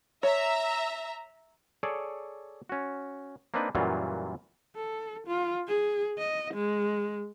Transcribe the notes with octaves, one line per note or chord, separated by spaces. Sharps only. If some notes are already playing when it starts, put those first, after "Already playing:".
C#5 E5 A#5
G#4 A4 C#5 D5
C#4 F#4
A#3 C4 D4 D#4 B4
F#2 A#2 E3 F#3 G3 F4
A4
F4
G#4
D#5
G#3